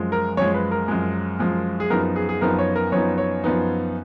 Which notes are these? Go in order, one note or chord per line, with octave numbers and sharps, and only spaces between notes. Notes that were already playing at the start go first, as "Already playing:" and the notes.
Already playing: F#2 F3 G#3
A#4
F#2 F3 G#3 C#5
B4
A#4
F#2 F3 G#3
F#2 F3 G#3
G#4
F#2 F3 B3 D#4 A#4
G#4
G#4
F#2 F3 B3 D#4 A#4
C#5
A#4
F#2 F3 B3 D#4 C#5
C#5
F#2 F3 B3 D#4